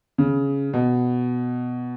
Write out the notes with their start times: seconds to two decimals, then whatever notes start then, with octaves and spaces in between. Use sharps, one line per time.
0.18 C#3
0.73 B2